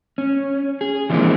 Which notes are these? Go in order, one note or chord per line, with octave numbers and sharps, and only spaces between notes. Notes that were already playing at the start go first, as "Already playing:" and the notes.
C#4
G#4
E3 F3 G#3 A#3 C4 D4